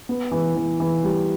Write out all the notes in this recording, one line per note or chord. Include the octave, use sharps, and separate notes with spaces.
B3
E3
E3
E3
G3